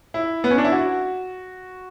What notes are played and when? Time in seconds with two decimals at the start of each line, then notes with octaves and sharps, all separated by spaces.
0.14 E4
0.44 B3
0.51 C#4
0.58 D4
0.64 E4
0.72 F#4